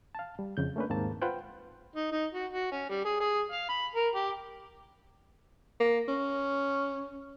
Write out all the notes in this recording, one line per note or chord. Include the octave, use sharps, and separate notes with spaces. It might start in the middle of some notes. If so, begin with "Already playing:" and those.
F5 A5
G3
F2 C#3 G6
A3 A#3 C#4 D4 B4
D#2 G#2 A#3 C4 A5
F4 B4 C5 F#5 G5
D#4
D#4
F#4
F#4
C#4
G3
G#4
G#4
F5
B5
A#4
G4
A#3
C#4